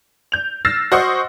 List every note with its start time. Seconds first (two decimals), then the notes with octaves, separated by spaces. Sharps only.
0.32 G6 F7
0.65 E6 F6 A6 A#6 C7 E7
0.92 F#4 C5 D#5 F#5 C#6